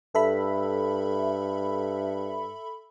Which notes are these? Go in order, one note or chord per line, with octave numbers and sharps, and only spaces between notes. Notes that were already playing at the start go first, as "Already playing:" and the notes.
G2 A4 E5 B5